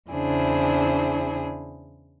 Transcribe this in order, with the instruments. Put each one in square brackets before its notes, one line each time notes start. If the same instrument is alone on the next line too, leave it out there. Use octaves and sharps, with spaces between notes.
[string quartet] E2 C#3 D4 E4 G#4 C5